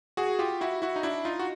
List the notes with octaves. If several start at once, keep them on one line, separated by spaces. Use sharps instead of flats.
F#4 G#4
F4 G4
E4 F#4
E4 F#4
D#4
D4 E4
D#4 F4
F#4